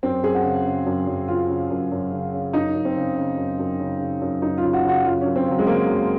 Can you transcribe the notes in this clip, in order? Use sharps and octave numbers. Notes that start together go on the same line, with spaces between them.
F#2 C4
F#2 G#4
F#4
C#3
C#3
F#2
F#2
C#3 F4
C#3
F#2
F#2
C#3
C#3
F#2 D#4
F#2
C4
C#3
C#3
F#2
F#2
C#3
C#3
F#2
F#2 D#4
F4
C#3
F#4
C#3 F#4
F#2 F4
C#4
F#2
C4
C#3 F#3
G#3
C#3 A#3
F#2